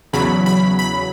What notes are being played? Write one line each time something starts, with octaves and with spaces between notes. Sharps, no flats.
E2 C#3 F#3 B5
B5
B5